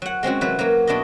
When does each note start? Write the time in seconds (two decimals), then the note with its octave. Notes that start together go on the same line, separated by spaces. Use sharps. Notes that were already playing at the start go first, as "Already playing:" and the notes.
0.02 F#3 F#5
0.23 G#3 C4 C#4 F#4
0.41 C3 E3 F#3 B4
0.59 F#3 A#3
0.87 B2 D4 E4 F#4 D#5